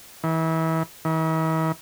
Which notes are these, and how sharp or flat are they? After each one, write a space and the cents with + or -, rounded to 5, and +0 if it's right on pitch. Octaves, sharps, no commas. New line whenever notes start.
E3 -30
E3 -45